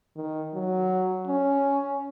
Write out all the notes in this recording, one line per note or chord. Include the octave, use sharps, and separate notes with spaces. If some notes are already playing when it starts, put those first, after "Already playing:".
D#3
F#3
C#4